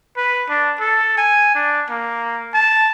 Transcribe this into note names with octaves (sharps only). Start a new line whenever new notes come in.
B4
D4
A4
G#5
D4
A#3
A5